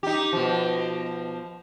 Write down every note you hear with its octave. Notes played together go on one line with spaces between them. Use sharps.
D#4 G4
B2 F3